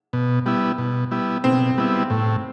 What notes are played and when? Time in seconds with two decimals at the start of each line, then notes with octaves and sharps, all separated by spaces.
0.13 B2
0.46 G3 B3 E4
0.78 B2
1.11 G3 B3 E4
1.44 B2 C4
1.78 G3 B3 E4
2.10 A2